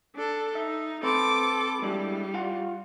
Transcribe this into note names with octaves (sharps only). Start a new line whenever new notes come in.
D4 A4
D#4 E5
C4 A4 B4 C5 D6
G3 G#3 D4 E4
F4 F5 F#5